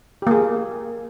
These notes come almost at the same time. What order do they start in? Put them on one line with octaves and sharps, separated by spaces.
G4 A#3 G#4